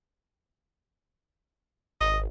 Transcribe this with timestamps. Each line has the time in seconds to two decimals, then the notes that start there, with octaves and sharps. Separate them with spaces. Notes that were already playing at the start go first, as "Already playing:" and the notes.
2.01 G#1 D#5